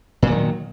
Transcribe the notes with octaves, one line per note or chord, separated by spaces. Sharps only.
A#2 D#3 F#3